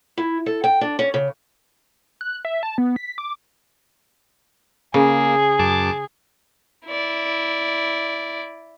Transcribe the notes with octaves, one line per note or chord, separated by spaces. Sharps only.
E4
A4
G5
D4
C#4
C#3
F#6
E5
A5
B3
B6
D6
C#3 A#3 G#4
F#2 A5 D6
E4 D5